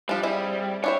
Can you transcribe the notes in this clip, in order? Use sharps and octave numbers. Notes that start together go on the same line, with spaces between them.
F3 G3 D4
C4 E4 G#4
D4 E4 C5 C#5